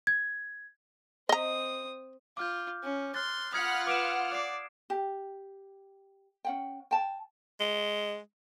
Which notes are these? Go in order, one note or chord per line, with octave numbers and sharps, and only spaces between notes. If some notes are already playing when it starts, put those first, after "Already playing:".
G#6
C4 D#5 A#5 D#6
F4 D6 F6 G6
C#4
C6 F6 F#6 A6
F4 F#5 B5 D#6 F6 G#6 C#7
B4 D6 D7 E7
D5 D6 C7
G4
C#4 F#5 G5
G5 A5
G#3